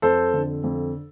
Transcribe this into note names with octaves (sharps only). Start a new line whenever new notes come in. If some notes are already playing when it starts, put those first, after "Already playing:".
F2 A4 C5
D3
F2